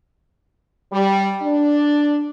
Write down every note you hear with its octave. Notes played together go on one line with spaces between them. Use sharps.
G3
D4